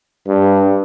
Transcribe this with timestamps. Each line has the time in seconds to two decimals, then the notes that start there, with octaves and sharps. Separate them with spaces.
0.27 G2